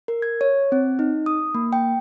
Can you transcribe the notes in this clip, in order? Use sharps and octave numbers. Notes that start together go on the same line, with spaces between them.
A#4
G#6
C#5
C4
D#4
D#6
A#3
G5